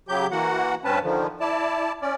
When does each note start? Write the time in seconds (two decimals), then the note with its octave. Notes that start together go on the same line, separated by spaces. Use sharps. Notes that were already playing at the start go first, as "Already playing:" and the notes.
0.08 C#3 F#3 G4 G6
0.31 E3 A#3 F#4 F#5
0.84 G2 C4 C#4 B4 A5
1.03 D3 D#3 F3
1.40 E4 D5 A5
2.02 C#4 D5